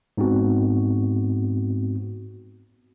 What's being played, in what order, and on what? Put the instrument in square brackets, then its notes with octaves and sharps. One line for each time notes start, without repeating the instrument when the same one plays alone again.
[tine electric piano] G#2 B3 C4 F#4